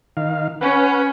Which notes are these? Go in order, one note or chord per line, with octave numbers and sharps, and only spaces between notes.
D#3 F5
C#4 B4 F#5